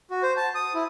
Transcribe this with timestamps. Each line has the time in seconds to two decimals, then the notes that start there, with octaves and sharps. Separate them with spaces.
0.10 F#4
0.23 C5
0.37 A5
0.55 D#6
0.74 E4